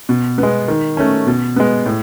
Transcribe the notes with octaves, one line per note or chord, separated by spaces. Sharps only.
B2
B3
G#3
D#3
A3 C#4
B2
G#3 B3
A2